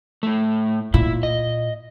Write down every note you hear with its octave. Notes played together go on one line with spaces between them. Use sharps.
A2 A3
A#2 E4
D#5